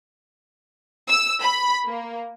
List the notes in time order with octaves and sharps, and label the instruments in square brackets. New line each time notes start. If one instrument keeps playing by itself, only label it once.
[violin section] E6
B5
A#3